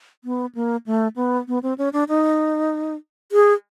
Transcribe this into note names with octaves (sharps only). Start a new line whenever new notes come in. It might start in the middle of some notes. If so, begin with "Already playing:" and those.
B3
A#3
A3
B3
B3
C4
C#4
D4
D#4
G#4